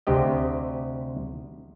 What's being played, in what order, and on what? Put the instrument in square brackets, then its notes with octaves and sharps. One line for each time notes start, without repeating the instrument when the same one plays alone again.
[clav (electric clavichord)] D2 C3 G4 D#5